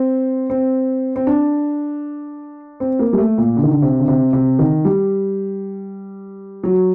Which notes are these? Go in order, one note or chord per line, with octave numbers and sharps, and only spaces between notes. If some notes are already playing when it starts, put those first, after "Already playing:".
Already playing: C4
C4
C4
D4
C4
A#3
G3
A3
A#2
D3
D#3
D3
C3
D3
C3
C3
D#3
G3
F#3